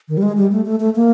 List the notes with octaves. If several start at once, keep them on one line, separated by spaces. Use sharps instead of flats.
D#3
G3
G#3
G3
A3
A3
A3
A#3